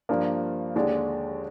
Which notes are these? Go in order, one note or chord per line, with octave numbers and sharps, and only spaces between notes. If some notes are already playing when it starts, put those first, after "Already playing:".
G2 F3 A#3 D4
D#2 D3 G#3 D4